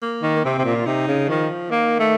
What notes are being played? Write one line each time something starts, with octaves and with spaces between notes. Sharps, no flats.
A#3
D#3
A#3
C3 C4
C3
A#2
F4
C3 D#4
C#3
D#3 F3
D#3 A#3
A3